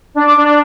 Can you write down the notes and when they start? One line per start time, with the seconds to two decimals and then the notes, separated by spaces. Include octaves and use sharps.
0.14 D4
0.25 D6
0.36 D4